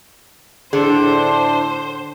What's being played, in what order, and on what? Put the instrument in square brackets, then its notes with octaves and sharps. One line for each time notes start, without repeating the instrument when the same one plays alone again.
[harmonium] A2 D4 [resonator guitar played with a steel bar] D3 [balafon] G#4 [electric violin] C5